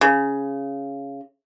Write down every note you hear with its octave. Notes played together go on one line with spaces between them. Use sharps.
C#3